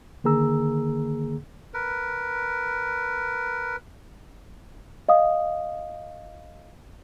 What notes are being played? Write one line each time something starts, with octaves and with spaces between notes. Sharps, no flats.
D3 D#3 A#3 G#4 A#5 E6
A#4 B4
D#5 F5 D#6